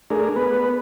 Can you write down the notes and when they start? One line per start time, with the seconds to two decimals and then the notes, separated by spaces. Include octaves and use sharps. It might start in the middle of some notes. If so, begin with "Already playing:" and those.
0.10 A3 D4 G#4 A#4
0.36 B3 B4